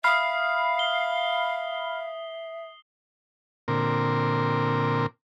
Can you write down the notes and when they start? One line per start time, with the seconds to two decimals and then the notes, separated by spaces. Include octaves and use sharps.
0.04 E5 F5 B5 D#6 F6 C7
0.79 G7
3.68 A#2 D3 C4 A#4